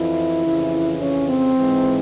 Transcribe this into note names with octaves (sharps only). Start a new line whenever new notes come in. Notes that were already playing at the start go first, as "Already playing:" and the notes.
Already playing: F2 E3 E4
F2 C#3 E3
C#4
C4
G#2 E3